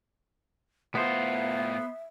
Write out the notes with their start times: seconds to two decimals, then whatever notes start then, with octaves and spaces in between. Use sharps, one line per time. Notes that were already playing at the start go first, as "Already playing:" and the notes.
0.95 A2 B3 F4 C5 E5